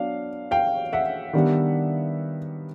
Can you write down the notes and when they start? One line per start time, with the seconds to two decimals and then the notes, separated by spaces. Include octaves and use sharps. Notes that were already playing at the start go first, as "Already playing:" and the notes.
Already playing: F#3 B3 D4 F5
0.51 F5 G5
0.93 E5 F#5
1.33 D#3 G3 B3 D4